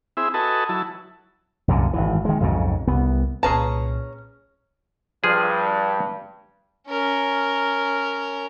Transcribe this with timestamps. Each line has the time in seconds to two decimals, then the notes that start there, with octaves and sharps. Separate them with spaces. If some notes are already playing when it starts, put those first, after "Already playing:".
0.17 C4 E4 G#4 E5
0.34 F#4 A4 B4 D#5 G#5 A5
0.69 F#3 E4 A5
1.68 C2 F#2 A#2 D3
1.93 G#1 G2 E3
2.25 D#3 G#3
2.40 B1 F2 G#2 C#3
2.87 C2 B3
3.43 C2 A#2 C#4 G#4 B4 A5 A#5
5.24 G2 F3 G#4
6.88 C#4 A#4